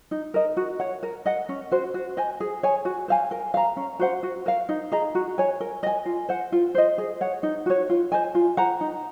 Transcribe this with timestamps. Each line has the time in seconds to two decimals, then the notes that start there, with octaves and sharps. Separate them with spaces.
0.11 D#4
0.34 A#4 D#5
0.57 F#4
0.80 C#5 F#5
1.03 A#4
1.26 D#5 F#5
1.49 C#4
1.71 F#4 C5
1.94 F#4
2.17 C5 D#5 G#5
2.40 G#4
2.63 C#5 G#5
2.85 F#4
3.08 C5 F5 G#5
3.31 A#4
3.54 F5 A#5
3.77 C#4
3.99 F#4 C5 F#5
4.23 F#4
4.46 A#4 F5
4.69 D#4
4.92 G#4 D#5 A#5
5.15 F#4
5.38 C#5 G#5
5.60 A#4
5.83 D#5 G#5
6.06 F4
6.29 C5 F#5
6.52 F4
6.75 C5 D#5
6.98 G#4
7.21 C#5 F#5
7.43 D#4
7.66 F#4 C#5
7.89 F4
8.12 C5 D#5 G#5
8.35 F4
8.57 C5 F#5 A#5
8.81 D#4